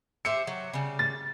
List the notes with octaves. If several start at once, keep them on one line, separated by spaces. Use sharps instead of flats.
G4 C5 E5 C#7
F#3
C#3 G3
A6